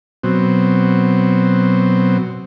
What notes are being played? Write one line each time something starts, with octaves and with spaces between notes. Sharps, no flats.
B2 F#3 C4